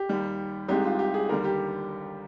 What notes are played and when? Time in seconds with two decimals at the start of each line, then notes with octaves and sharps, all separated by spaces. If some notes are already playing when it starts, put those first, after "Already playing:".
Already playing: G4
0.09 D#2 D#3 G3
0.68 C2 C3 D#3 G#3 G4
0.84 F4
0.99 G4
1.14 G#4
1.29 D#2 D3 G3 A#4
1.45 G4